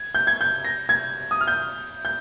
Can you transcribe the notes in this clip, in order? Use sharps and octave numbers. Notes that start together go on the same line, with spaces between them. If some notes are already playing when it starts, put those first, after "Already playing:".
Already playing: G#6
G6
G#6
G6
A#6
G#6
D#6
F6
G6
G6